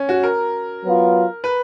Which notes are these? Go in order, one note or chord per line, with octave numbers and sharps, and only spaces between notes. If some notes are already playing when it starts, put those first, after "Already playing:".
Already playing: C#4
F#4
A#4
F#3 B3 F4
B4